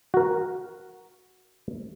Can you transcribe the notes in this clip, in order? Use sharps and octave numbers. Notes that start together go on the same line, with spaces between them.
F#4 A#4